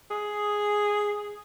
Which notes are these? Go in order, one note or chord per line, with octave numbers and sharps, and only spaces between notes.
G#4